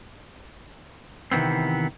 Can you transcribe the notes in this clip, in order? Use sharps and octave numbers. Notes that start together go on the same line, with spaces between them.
C3 D#3 E3 B3 C4